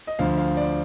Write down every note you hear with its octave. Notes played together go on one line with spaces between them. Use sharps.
D#5
D2 D3 F3 F5
F5
D5